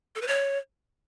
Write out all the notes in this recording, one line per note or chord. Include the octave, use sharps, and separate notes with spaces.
A4
B4
C#5